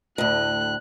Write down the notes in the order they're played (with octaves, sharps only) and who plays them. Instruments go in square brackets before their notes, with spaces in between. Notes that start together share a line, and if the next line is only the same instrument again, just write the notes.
[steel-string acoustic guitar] D2 A2 [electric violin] F#6